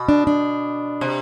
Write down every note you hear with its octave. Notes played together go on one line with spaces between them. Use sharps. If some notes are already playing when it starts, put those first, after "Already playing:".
Already playing: B2
D4
D4
C3